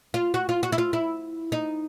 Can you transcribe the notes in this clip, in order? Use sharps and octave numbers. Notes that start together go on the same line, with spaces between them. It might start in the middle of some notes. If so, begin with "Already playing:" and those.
F4
F#4
F4
F#4
E4
F4
E4
D#4